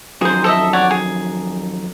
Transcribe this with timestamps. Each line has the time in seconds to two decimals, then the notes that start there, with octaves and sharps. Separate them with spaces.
0.21 F2 D#3 F#3 G#4 C5
0.44 A4 D#5 E5
0.73 C#5 D5 F#5
0.91 G#4